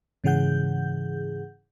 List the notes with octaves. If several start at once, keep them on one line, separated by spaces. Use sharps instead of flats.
G#2 C#3 E3 G#4 F#5 G6